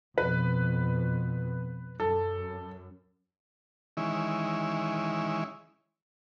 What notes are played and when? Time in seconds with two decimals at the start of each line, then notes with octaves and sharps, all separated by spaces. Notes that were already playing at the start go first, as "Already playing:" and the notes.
0.18 F2 B2 B4
2.00 F#2 A4
3.97 D#3 E3 G#3 C#4 E4